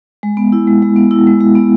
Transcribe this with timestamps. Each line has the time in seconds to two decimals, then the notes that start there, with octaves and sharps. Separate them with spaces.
0.23 G#3
0.37 B3
0.52 E4
0.67 G#3
0.82 G#3
0.96 B3
1.11 E4
1.27 G#3
1.41 G#3
1.55 B3